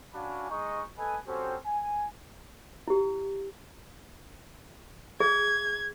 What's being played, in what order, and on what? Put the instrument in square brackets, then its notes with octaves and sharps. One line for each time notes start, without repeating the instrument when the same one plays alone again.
[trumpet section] C#4 D4 F#4 F5 G#5 B5
G#3 D#4 D#5 C#6
A4 B4 D#5 G#5
C4 C#4 F#4 G4 A4 C5
G#5
[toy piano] E4 G4
[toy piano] G#4 [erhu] G#6